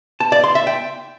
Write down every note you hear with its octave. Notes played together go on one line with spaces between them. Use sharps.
A5
D5
C6
E5
G5